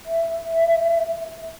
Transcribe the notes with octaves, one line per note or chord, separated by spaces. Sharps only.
E5